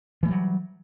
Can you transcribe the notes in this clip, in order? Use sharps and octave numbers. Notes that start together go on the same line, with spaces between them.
E3 F#3 G3 A3